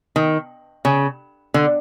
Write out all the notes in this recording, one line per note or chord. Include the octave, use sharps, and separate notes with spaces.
D#3
C#3
D3